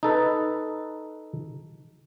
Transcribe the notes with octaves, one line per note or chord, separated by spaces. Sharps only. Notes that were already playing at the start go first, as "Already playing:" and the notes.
D#4 A4 B4